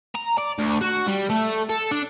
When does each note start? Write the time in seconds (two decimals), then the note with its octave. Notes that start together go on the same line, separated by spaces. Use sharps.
0.15 A#5
0.38 D5
0.59 D2
0.82 F#4
1.09 G3
1.30 A3
1.70 A4
1.92 D4